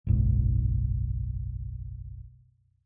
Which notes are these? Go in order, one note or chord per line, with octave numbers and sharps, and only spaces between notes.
F#1 B1 G#2